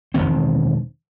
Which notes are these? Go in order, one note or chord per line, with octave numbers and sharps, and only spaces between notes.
E1 C2 D#3 C4